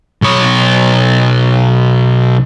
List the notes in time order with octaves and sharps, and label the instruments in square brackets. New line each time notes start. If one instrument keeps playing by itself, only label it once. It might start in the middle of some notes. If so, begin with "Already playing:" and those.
[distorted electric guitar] B1 C#5